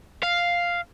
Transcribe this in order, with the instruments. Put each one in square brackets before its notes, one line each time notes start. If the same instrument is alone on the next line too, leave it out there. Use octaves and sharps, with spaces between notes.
[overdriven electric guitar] F5